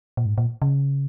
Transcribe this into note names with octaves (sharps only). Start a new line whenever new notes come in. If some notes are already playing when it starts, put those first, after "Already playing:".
A#2
G#2
A#2
C#3